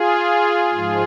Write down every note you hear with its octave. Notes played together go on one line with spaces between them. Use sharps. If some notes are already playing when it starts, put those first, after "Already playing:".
Already playing: F4 G#4
G#2 F3